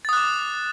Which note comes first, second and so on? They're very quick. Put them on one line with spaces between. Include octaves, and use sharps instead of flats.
A6 D#6 F#6 D6